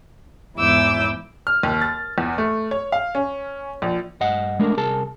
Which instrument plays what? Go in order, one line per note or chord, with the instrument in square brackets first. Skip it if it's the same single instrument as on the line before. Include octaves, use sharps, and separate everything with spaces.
[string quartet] E2 G#2 E4 D6 E6 G6
[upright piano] F6
D#2
A6
E2
A3
C#5
F5
C#4
A#1
[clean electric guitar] G2 D#5 F#5
G#3 A3 D4 A#4
C2 G#4 A#4 A5